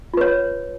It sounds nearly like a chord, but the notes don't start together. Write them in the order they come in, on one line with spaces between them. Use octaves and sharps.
F4 B4 C#5